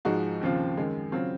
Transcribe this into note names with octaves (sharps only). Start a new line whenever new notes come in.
G#2 F3 G#3 D#4 F#4
D#2 C#3 F3 C4 F4
F#2 D#3 G#3
C#3 F#3 C4 F4